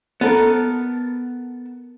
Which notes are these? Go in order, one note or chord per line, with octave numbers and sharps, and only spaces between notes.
B3 A4 A#4